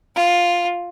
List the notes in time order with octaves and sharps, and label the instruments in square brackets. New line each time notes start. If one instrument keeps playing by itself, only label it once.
[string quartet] F4